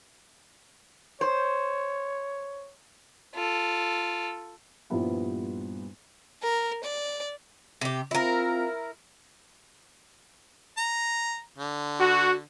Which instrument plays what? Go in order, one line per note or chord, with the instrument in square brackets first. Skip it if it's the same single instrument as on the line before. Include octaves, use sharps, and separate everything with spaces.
[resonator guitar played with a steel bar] C5 [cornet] C#5
[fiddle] F4 A4
[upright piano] G2 A#2 F3 G3 B3 E4
[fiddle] A#4
D5
[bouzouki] C3 G4
[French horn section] C4 F4 [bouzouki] E4 A#4
[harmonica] A#5
D3
[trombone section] F#4